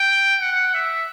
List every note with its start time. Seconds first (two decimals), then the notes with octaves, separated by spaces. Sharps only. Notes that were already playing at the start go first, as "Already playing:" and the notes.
Already playing: G5
0.41 F#5
0.74 E5